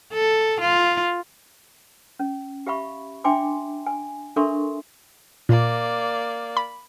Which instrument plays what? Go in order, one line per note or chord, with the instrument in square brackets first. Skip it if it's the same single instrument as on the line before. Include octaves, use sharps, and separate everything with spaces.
[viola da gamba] A4
F4
[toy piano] C#4
G4 E5 F5 B5 C#6
D4 E5 G5 G#5 C6 D6
G#5
D4 A4 A#4 E5 C6 C#6
[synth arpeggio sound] A#2 [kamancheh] A#3 D5
[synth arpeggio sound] B5